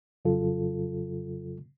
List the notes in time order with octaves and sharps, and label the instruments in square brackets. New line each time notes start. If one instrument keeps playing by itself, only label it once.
[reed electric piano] F2 C#3 F#3 F4 A4